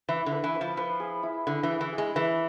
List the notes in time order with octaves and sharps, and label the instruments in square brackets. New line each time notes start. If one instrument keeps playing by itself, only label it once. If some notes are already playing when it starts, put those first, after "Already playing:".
[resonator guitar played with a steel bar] E3 [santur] E4
[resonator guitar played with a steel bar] D3
[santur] B4
[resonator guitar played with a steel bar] E3
[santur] B4
[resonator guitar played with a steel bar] F3
[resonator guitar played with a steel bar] F3 [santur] B4
[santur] G#4
E4
[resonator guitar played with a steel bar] D3 [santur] E4
[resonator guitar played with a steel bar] E3
[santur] G#4
[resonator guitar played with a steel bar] E3
[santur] G#4
[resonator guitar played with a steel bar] G#3
[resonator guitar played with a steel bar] E3 [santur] B4